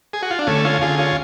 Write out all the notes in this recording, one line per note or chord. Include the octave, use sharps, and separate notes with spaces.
G#4
F#4
F4
D4
D2 A3 C#4
C#4 F4
D2 F4 G#4
C#4 F4